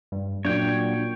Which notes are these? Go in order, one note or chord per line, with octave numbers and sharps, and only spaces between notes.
G2
A#2 F#3 D4 C#5 G5